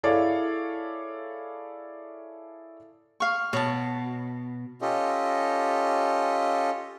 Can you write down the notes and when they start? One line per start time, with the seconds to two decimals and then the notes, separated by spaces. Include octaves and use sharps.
0.03 E4 G#4 A4 C#5 D5 F5
3.20 F5 C#6
3.53 B2 C#5 A5
4.82 C#4 F4 G4 A4 D#5